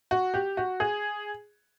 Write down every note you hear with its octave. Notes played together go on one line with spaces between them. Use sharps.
F#4
G4
F#4
G#4